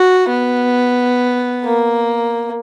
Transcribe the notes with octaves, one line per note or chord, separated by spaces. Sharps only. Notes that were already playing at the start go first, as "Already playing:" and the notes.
Already playing: F#4
B3
A#3